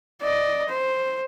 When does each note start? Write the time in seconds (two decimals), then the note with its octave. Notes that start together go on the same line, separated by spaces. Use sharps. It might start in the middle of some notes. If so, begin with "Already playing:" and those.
0.22 D5 D#5
0.69 C5